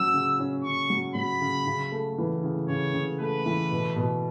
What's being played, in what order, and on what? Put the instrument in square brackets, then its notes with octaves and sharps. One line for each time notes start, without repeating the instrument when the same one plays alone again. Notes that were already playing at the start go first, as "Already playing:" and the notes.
Already playing: [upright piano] F#3 C#4 [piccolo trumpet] E6
[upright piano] C#3
C#4
[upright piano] C#3 [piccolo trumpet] C#6
[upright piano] F#3
[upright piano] F#3 [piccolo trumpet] B5
[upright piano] C#3
C#3
A3
E3
C#3
[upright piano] C#3 [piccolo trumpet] C#5
[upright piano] C#3
[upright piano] A3 [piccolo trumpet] B4
[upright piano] E3
B2
B2